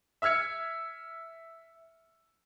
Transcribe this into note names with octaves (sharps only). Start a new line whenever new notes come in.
E5 E6 F6 G#6 C#7